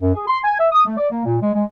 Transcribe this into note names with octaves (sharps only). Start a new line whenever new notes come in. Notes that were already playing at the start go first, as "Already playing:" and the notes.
F#2
G#4
C6
G#5
E5
D#6
A3
D5
A#3
A#2
G#3
G#3